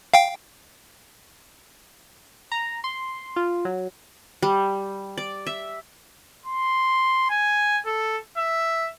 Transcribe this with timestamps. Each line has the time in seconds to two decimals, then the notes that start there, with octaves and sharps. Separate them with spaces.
0.14 F5 G5
2.52 A#5
2.84 C6
3.36 F4
3.65 F#3
4.43 G3
5.18 D5
5.47 E5
6.46 C6
7.30 G#5
7.86 A4
8.38 E5